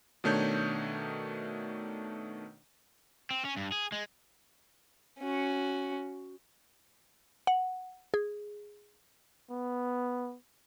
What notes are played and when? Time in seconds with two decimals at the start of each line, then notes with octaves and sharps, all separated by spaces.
0.24 B2 D#3 A3 D4 C#5 G6
3.31 C4
3.45 C#4
3.57 G2
3.72 G#4
3.92 G#3
5.19 C#4 F#4
7.47 F#5
8.14 G#4
9.50 B3